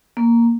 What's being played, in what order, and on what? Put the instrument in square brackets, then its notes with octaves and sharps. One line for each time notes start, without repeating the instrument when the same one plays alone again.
[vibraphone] A#3